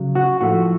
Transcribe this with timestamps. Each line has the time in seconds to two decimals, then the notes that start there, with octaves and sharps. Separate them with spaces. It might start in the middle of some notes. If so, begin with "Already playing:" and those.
Already playing: C#3 F#3
0.15 F#4
0.41 A2 F3 A3 F#4